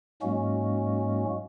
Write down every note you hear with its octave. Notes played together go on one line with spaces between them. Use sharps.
G#2 F#3 G#3 A#3 C#4 F#4